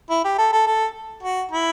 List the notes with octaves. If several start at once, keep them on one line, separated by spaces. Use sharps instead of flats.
E4
G4
A4
A4
A4
F#4
E4